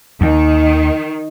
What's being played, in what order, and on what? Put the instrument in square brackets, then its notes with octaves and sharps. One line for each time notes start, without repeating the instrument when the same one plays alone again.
[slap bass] D#2 [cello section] D#3